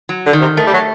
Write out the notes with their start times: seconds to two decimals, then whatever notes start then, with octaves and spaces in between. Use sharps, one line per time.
0.09 F#3
0.25 D3
0.33 D#3
0.41 C3
0.57 D#3 A3
0.67 G3
0.73 F#3